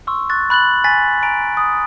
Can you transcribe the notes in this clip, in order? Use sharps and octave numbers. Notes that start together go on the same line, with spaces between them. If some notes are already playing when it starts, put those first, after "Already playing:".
C6 C#6 E6
C#6 F#6 A6
B5 F#6 A6 F#7
G#5 A6 B6
G#5 A#5 D7
D#6